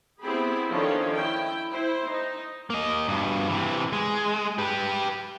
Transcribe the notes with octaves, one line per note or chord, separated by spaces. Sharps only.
B3 C4 E4 G4 G#4 B5
D#3 F3 C#4 D4 A4 C#5
E4 G5
E4 C5
D#4
A#3 D#5
G2 B2
C3 E3
G#3
G4 B4